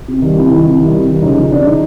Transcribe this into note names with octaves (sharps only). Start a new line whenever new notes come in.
C3
D#3 G3
C3 E4
D#3 G3
C3
D#3 G3
C3
D#3 G3
C#3 D#4
F3 D#4
C#3 D4
F3 D#4